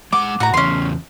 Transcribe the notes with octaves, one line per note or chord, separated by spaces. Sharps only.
G#3 F#5 D6
A2 F#4 A#5
E2 C#3 C#4 C6